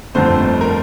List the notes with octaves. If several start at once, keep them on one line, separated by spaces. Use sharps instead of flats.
G1 F2 D3 A3 C4 C5
A#4